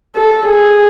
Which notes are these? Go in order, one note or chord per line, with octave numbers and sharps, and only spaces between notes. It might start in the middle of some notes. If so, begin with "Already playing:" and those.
A4
G#4